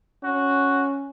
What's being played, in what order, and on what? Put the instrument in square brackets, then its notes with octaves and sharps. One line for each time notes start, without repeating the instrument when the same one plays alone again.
[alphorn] C#4 [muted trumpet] F#4